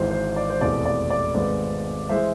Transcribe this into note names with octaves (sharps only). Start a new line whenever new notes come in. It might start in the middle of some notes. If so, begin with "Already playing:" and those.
Already playing: G#1 G#2 E3 C5
C5
D5
C5
F1 E2 B2 D5
D5
D5
G#1 G#2 G#3 B3 D5
E3 G#3 C5 E5